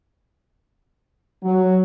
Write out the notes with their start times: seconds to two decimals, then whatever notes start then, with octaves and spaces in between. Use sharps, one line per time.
1.43 F#3